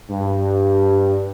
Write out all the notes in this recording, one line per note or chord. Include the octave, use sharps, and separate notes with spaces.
G2